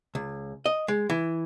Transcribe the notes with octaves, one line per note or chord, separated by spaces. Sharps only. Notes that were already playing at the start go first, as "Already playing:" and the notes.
C#2
D#5
G#3
E3